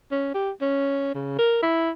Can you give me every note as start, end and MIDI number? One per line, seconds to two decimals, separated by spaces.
0.12 0.31 61
0.34 0.51 67
0.61 1.13 61
1.15 1.34 49
1.38 1.60 70
1.62 1.90 64